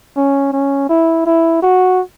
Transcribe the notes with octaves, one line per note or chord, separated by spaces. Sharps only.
C#4
C#4
E4
E4
F#4